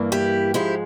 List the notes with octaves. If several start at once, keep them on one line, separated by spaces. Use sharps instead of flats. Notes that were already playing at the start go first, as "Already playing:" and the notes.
Already playing: G2 E3 A#3
E4 G4
G#2 F3 G#3 E4 G4